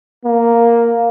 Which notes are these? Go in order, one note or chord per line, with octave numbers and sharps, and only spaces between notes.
A#3